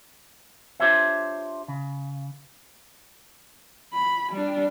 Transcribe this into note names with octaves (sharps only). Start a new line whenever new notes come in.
D4 F4 G4 C5 C#5 E5
C#3
B5
G3 D4